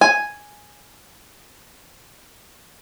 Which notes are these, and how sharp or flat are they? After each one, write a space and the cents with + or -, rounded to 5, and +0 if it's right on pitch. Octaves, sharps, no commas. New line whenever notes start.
G#5 +0